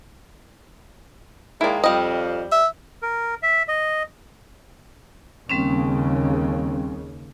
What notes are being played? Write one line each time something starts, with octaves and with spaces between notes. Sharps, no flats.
D#3 G#3 A#3 E4 D5
F2 G3 D#5
E5
A#4
E5
D#5
D#2 C#3 G3 C4 C#4